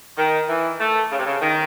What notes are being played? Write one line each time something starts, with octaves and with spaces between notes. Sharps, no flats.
D#3
E3
A3
C#3
C3
C#3
D#3